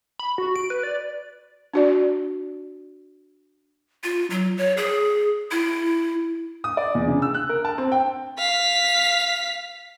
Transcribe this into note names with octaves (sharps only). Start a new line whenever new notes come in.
B5
F#4
D7
B4
D5
D4 F#4 D5
F4
F#3
C#5
G#4
E4
D#6
D5
E2
C#3
E6
F#6
A#4
A5
C4
G5
F5 B6